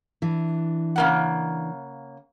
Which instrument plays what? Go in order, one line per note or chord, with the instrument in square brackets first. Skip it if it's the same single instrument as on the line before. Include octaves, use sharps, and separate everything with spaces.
[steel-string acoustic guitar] E3 D4
[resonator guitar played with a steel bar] C#3 A#3 F#5